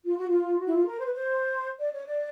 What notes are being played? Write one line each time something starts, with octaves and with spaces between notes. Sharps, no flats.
F4
F#4
F4
F#4
E4
F4
A#4
C5
B4
C5
D5
C#5
D5